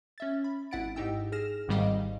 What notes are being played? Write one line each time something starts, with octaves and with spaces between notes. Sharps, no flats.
C#4 E5 A6
B5
G#1 E4 F#5 A6 D7
G#2 D#4 G4 G5 E6
G#4 F6 A#6 E7
G#1 G#2 D#3 G3 D#5 F5